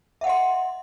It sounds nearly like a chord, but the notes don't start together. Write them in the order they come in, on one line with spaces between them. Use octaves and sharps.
E5 F#5 D#5 C6